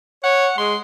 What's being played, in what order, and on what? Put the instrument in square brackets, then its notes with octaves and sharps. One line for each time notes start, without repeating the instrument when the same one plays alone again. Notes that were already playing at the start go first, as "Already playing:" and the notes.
[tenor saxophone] C#5 [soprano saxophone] F#5
[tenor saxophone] G#3 [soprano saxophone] C6